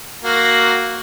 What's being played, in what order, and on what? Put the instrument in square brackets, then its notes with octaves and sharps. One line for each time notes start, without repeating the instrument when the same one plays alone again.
[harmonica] A#3 F#4